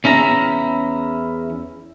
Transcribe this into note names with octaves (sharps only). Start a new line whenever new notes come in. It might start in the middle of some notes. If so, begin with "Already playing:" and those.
E2 C#4 E4 A#5